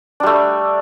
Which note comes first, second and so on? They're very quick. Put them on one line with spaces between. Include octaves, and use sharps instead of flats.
D4 G3 A3